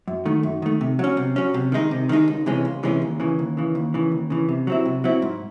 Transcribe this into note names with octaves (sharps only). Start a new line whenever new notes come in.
F#2
D#3 A3
F#2
D#3 A3
C3
F#3 C#4
C3
F#3 C#4
C3
D#3 G#3 D#4
C3
D#3 G#3 D#4
C#2
C3 E3 G#3 C#4
C#2
C3 E3 G#3 C#4
D#2
C#3 E3
D#2
C#3 E3
D#2
C#3 E3
D#2
C#3 E3
C3
F#3 C4 E4
C3
F#3 C4 E4
G#2